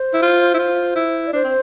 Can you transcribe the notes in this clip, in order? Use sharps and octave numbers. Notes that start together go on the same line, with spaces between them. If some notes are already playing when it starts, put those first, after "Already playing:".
Already playing: C5
E4
F4
E4
F4
E4
D5
D4 C5
C4